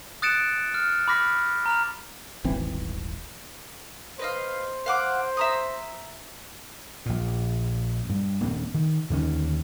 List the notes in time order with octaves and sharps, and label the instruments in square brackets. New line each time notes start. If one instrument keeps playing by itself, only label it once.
[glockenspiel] D#6 F#6 A6 C#7 D7 E7
F6
B5 D6 F6 A#6 B6
A#5 F6 F7
[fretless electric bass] D#1 G#1 E3 C4
[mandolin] B4 D#5 F5 [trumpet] C5
[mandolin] F5 F#5 D6
E5 A#5 D#6
[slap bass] A#1 A#2
G2
D#1 A#3 C4 D4
D#3
D#2 D3 D#3 C#4